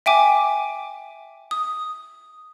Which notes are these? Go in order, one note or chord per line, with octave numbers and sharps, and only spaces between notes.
E5 G5 G#5 D6
D#6